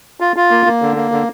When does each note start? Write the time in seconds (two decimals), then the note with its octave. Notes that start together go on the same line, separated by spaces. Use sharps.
0.20 F4
0.36 F4
0.51 A#3
0.66 A#3
0.82 D3
0.96 A#3
1.12 D3